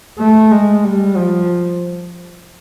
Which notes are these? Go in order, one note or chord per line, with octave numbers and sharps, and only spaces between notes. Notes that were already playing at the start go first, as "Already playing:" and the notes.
A3
G#3
G3
F3